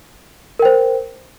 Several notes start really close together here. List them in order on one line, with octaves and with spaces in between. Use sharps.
A#4 G5 C5